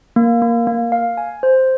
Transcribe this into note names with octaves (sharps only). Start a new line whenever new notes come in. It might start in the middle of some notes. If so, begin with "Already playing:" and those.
A#3
A#3
A#3
F5
G#5
C5